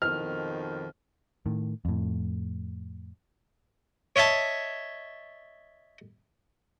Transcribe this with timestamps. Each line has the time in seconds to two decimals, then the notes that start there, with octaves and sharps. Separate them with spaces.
0.02 F2 B2 D#3 F6
1.46 A2 D#3
1.85 F2 A2
4.16 C#5 D#5 E5 A5